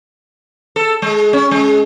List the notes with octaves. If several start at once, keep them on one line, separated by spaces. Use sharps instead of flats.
A4
G#3
C#4
G#3